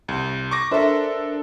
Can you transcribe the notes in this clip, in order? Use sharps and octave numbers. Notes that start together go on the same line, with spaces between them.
C2
C#6 D6 A#6
D4 A4 A#4 C5 E5